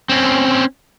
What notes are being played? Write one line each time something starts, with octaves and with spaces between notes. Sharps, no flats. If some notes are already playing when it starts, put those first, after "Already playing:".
C4 C#4